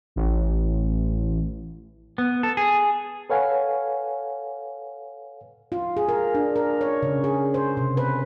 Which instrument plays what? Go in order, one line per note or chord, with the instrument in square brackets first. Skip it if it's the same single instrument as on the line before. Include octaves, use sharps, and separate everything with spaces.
[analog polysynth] A1
[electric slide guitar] B3
A4
G#4
[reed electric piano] A4 B4 C#5 F5 F#5 G#5
[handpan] F4
G#4
A#4
D4
A#4
C#5
C#3
G#4
C5
C3
B4